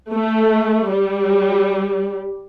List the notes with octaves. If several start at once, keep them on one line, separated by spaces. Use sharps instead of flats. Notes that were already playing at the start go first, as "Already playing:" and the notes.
A3
G3